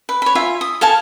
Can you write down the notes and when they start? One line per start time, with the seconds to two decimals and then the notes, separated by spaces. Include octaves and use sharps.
0.09 B4
0.22 C#5 B5
0.35 F4 E5 G#5
0.61 D#6
0.81 A4 F5 G#5 A5